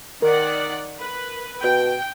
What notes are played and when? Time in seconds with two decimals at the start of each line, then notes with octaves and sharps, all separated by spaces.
0.22 D#3 A#4 D5 F#5
1.02 B4
1.64 B2 G5